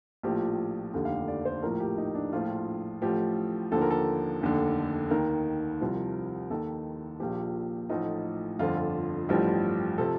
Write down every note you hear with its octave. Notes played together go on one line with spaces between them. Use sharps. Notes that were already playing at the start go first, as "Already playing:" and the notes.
A#1 A2 F3 G4
F1 D#2 D3 G4
F5
D5
C5
A#1 A2 F3 A#4
G4
D#4
D4
A#1 A2 F3 F4
A1 A2 F3 G4
D#2 D3 F3 A4
A#4
A4
F1 D#2 D3
D#2 D#3 A#4
C2 C3 F3
D#2 D#3 A4
A#1 A#2 F3 G4
A1 A2 F3 D#4
G1 F2 D3 F3 F4
F4
A1 G2 F3 G4
C3 F3 A4